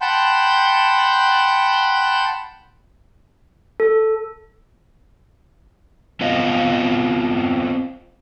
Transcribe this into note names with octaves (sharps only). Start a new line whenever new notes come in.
F#5 G5 A5 B5 C6 G6
A4
B3 C4 F4 D#5